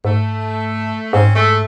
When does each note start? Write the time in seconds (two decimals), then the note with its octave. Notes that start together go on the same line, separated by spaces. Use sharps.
0.05 G#2 A3
1.13 G#2 C4 C#4
1.35 G#3 A3